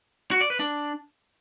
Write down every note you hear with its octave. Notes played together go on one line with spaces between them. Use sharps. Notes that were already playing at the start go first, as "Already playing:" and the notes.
F#4
D5
B4
D4